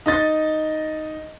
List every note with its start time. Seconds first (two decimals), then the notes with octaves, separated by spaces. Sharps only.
0.06 D#4 D#5 A6